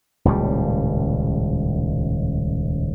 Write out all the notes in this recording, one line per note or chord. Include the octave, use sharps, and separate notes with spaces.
D#1 C#2 A2 G3